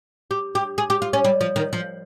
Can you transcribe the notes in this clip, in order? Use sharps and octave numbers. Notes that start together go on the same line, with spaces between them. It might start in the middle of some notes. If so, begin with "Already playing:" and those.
G4
G4
G#4
G4
F4
C#4
G3
F3
D#3
F3